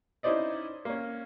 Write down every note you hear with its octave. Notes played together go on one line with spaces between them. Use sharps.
C#4 D#4 E4 C5 D5 D#5
A#3 C#4